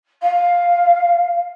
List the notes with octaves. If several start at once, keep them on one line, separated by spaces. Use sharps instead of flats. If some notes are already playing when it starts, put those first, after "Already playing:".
F5